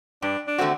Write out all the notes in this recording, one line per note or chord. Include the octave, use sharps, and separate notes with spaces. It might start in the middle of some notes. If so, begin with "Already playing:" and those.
G2 D4
D4
D3 A3 C4 F#4